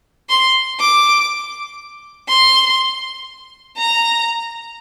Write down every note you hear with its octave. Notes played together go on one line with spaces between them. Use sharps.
C6
D6
C6
A#5